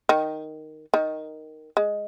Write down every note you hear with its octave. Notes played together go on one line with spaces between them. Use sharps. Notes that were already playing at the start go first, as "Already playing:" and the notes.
D#3
D#3
G#3